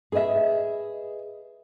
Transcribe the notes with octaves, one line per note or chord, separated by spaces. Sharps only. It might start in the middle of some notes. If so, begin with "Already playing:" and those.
G#4 B4 C#5 D#5 E5